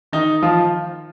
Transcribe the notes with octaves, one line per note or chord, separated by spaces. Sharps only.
D#3 D#4
F3 F4